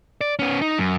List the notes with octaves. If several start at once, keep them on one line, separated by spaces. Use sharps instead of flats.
D5
B3 C#4
D#4
F#2